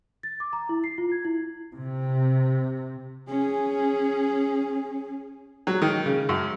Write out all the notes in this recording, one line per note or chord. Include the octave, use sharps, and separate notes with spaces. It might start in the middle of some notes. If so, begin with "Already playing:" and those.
A6
D6
A#5
E4
C7
F4
G#6
E4
C3
C#4 G#4
F#3
D#3
C#3
F#2